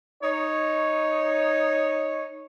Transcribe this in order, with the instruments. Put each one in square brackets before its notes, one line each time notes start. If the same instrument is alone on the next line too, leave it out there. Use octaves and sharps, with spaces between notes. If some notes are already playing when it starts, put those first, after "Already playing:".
[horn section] D#4 C#5